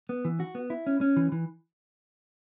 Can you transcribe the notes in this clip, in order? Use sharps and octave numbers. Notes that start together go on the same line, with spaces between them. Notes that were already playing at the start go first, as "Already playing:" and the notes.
B3
E3
F#4
B3
E4
C#4
C#4
E3
E3